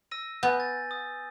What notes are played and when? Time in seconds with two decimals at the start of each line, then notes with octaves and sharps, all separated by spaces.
0.11 E6 A#6 D#7
0.43 B3 G#5 G6
0.60 A6
0.91 D#6